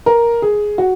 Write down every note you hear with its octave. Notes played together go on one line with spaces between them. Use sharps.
A#4
G#4
F#4